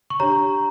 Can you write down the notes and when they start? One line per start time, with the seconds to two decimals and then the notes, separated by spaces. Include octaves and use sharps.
0.10 C#6
0.20 D4 G4 C#5 A#5